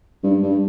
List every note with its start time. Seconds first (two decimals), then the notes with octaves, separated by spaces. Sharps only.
0.23 G2
0.43 G2